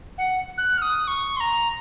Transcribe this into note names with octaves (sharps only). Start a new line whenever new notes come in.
F#5
F#6
F6
D#6
C#6
C6
A#5